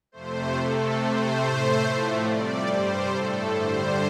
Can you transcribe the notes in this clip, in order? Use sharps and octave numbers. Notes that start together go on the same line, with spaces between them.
F2 C3 A3 C5
C3 A3 A4
C3 A3 C5
A2 A3
A2 F3 A3
C3 G3 D5
G2 G3 C5
A2 A3 A4
G2 D3 G3 C5